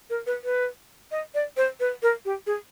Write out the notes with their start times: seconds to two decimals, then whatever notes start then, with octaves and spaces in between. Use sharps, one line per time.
0.10 A#4
0.26 B4
0.44 B4
1.11 D#5
1.35 D5
1.57 C5
1.80 B4
2.03 A#4
2.25 G4
2.47 G#4